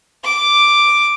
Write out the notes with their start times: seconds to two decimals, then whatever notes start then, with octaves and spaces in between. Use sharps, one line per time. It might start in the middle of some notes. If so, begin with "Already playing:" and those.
0.24 D6